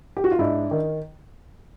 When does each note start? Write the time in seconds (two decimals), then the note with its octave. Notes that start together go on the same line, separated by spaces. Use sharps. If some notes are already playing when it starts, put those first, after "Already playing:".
0.17 G4
0.24 F#4
0.31 F4
0.39 G#2 D4 E4
0.71 D#3